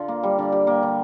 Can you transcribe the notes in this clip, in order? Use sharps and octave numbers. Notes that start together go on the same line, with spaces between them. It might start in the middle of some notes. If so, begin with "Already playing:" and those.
Already playing: D3 F4
A#3
G3
D3
G4
A#3
D3